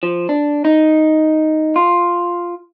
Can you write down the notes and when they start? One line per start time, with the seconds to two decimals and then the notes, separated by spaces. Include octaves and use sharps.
0.03 F3
0.29 D4
0.65 D#4
1.76 F4